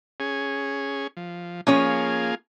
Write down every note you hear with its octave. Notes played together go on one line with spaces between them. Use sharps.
C#4 G#4
F3
F3 A#3 C#4 F4 G#4 C#5